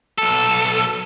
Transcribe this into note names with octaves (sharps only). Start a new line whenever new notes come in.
B1 A4